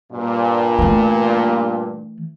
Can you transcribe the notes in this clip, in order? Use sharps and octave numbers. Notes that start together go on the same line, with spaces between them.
G2 A#2
E3 A3